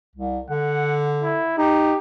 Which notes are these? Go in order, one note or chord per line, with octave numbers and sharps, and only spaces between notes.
C2
D3 F#5
E4
D#4 G4